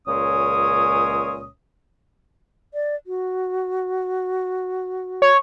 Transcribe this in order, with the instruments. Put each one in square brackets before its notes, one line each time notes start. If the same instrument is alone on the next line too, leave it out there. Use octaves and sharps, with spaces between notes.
[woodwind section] C#2 A#2 G#3 C#4 C#5 D#6
[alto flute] D5
F#4
[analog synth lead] C#5